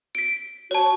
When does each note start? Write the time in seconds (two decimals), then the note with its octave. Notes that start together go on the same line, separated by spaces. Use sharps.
0.15 B6 D7
0.71 F#4 C#5 A5